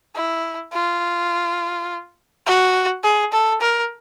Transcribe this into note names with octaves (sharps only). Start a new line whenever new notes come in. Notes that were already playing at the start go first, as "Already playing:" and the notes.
E4
F4
F#4
G#4
A4
A#4